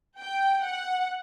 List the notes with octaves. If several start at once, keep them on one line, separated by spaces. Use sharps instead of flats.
G5
F#5